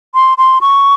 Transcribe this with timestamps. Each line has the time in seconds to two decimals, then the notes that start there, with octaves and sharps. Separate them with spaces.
0.14 C6
0.38 C6
0.61 C#6